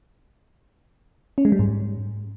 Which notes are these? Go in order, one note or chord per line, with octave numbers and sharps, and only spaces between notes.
C#4
G#3
G3
G#2